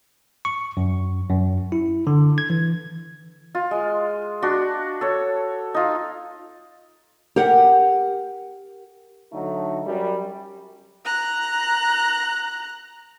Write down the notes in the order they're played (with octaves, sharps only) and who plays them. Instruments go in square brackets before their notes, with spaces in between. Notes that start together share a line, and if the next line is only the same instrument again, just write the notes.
[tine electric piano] C#6
F#2
F#2
E4
D3
G#6
E3
[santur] F4
G#3
D4 F#4
A4 C#5
D#4 F4
[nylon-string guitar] G4 A#4 F#5
[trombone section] D3 F#3 A3 D#4
F#2 G3
[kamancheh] A#5 F#6